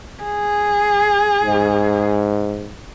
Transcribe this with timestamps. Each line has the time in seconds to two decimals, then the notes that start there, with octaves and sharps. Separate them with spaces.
0.23 G#4
1.43 G#2